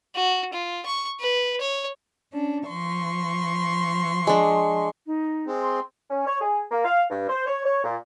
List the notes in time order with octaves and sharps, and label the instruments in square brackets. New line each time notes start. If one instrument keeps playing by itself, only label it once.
[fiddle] F#4
F4
C#6
B4
C#5
[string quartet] C#4 D4
F3 C6 C#6
[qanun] G#3 D4
[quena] D#4
[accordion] G#3 C4
[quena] C6
[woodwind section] C#4
C#5
G#4
A#3
F5
G2
C5
C#5
C#5
A#2